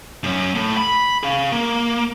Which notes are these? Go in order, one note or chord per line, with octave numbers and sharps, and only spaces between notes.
F#2 C#4
A2
B5
G#4 F5
A#3